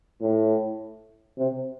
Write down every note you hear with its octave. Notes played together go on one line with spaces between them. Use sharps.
A2
C3